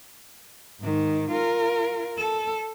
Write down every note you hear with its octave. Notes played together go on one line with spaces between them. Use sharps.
G#2 D#3
F4 A#4
A4